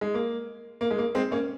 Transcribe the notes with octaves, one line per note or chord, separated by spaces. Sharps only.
G#3
A#3
A#3
G#3
A#3
G#3 C4
A#3 C#4